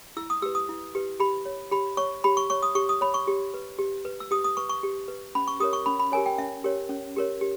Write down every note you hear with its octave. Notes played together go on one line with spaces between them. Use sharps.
E4 E6
D#6
G4 B4 E6
D#6
E4
G4 B4
G4 B5
C#5
G4 B5
C#5 C#6
G4 B5
C#6
C#5 C#6
D#6
G4 C#6
D#6
C#5 B5
C#6
G4
B4
G4
B4
E6
G4 D#6
D#6
B4 C#6
C#6
G4
B4
C#4 B5
C#6
G4 A#4 C#5 D#6
C#6
C#4 B5
B5
G4 A#4 C#5 G#5
G5
C#4 E5
G4 A#4 C#5
C#4
G4 A#4 C#5
G4